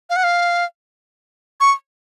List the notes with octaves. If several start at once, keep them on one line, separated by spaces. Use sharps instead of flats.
F5
F#5
F5
C#6